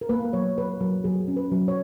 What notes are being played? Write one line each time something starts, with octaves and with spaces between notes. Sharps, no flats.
A#4
A#3 B4
F#3 C#5
F#3 B4
F#3 A#4
F#3 G#4
C#4
B4
F#3
C#5